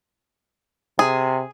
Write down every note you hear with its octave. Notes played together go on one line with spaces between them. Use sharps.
C3 G#4